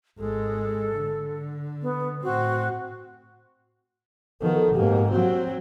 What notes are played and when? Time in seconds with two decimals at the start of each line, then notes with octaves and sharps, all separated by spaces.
0.18 G#1 G#3 A4
0.95 D3
1.82 B3
2.23 A2 C4 F#4
4.41 D#3 F3 B3 F#4 A4
4.75 G#2 B2 A#3 C4 G4
5.11 F#3 C4 F#4